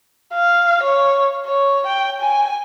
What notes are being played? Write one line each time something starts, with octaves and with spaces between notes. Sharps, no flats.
F5
C#5
C#5
G5
G#5